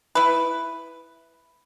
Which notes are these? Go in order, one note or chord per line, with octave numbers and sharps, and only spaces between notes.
E4 B4